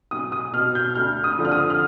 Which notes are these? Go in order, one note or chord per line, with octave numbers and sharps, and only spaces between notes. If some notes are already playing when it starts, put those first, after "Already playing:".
B1 D#6
D#6
B2 F6
G6
D2 F6
D#6
D3 F3
F6
D#6
F6